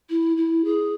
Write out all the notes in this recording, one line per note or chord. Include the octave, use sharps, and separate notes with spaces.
E4
E4
G#4